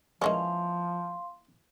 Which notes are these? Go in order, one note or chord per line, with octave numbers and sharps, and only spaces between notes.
E3 F3 G3 G#3 A#3 C#4 F5 C6